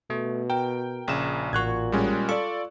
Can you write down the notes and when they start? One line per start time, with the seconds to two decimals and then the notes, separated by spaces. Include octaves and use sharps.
0.10 B2 A3
0.50 A#4 G5
1.08 A#1 C#3 E7
1.53 A1 A#2 F#4 C#6 F#6 G#6
1.92 G3 G#3 C#4
2.29 F4 A4 D5 C#6